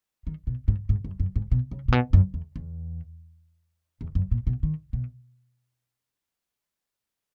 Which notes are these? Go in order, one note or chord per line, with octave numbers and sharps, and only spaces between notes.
D#3
B2
G#2
G#2
F#2
F#2
G#2
B2
C#3
A#2
B2
F#2
E2
E2
E2
F#2
A#2
B2
D#3
B2